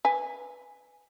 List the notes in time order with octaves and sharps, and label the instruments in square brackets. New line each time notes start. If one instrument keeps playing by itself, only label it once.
[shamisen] B4 G#5